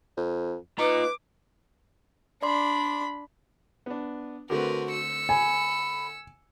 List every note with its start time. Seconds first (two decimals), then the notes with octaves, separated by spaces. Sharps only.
0.17 F2
0.79 D#4 F4 B4 A#5 D6
2.43 D4 D5 B5 C6
3.86 B3 D4
4.50 D3 A3 C4 F#4 A#4 B4
4.91 E6 C#7
5.29 G#5 B5